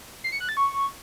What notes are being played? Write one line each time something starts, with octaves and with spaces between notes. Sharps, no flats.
C7
C#7
F#6
A6
C#6